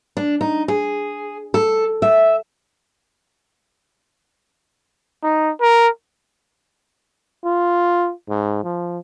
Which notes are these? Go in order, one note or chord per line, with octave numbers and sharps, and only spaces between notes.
D4
D#4
G#4
A4
E5
D#4
A#4
F4
G#2
F3